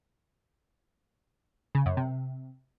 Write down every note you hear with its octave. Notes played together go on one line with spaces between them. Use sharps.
C#3
F#2
C3